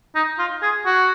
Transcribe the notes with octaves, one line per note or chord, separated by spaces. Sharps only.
D#4
F4
G#4
F#4